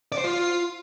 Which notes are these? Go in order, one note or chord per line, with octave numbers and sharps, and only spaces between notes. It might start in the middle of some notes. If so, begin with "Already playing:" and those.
D5
C5
F4